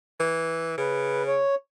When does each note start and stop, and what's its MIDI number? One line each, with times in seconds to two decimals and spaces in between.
0.20 0.74 52
0.78 1.41 49
0.78 1.23 71
1.27 1.55 73